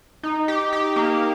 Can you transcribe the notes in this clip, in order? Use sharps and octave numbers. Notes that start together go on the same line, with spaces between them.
D#4
G4
G4
A#3